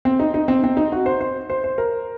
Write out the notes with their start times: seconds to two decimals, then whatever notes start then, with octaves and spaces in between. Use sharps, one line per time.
0.05 C4
0.19 D#4
0.34 D#4
0.48 C4
0.64 C4
0.77 D#4
0.92 F#4
1.06 C5
1.21 C5
1.50 C5
1.64 C5
1.78 A#4